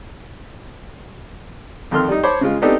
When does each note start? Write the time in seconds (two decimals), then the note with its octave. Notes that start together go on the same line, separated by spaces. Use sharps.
1.91 F2 D#3 A4 C6 F6
2.08 G3 D#4
2.23 C5 C#5 A5 B5 D6
2.41 C#3 G#3 F4
2.62 B3 C4 D4 D#4 G4 A4